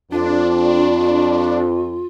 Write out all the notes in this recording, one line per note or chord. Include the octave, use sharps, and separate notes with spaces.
F2 D4 F4